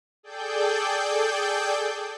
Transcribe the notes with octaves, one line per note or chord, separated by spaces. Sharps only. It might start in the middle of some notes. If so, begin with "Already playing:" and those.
G#4 A4 D5 G5 G6